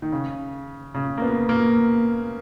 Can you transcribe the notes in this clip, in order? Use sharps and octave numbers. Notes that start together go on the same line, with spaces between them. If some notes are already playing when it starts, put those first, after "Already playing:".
D#3
C#3
C#3
A#3
B3
A#3